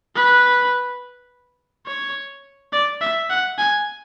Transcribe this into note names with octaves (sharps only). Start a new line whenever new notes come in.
B4
C#5
D5
E5
F#5
G#5